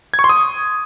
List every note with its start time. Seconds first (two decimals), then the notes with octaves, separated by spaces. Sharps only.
0.14 G#6
0.19 C#6
0.24 C6
0.29 D#6